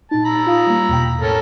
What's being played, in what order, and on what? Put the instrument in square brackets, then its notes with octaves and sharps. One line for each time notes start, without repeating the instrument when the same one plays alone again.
[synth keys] A#2 D#4 [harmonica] A5
[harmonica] A#5 B5 E6
[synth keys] F4 F5 D#6
G3 A#3
E2 B2 G5
[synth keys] A2 [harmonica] C#4 A4 A#4